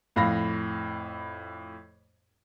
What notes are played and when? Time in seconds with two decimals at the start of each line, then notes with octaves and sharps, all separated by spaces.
0.16 F2 A2 F5 B5 A#6